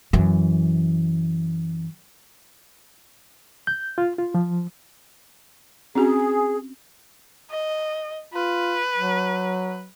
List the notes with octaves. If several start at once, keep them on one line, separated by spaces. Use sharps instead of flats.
F#2 E3
G6
F4
F4
F3
C4 C#4 F#4 G#4
D#5
F4 B4
F#3